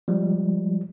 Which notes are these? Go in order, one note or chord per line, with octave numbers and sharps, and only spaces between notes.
F3 G3 G#3